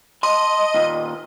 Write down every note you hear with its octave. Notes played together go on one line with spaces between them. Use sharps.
D#5 A5 C6
D#2 A#2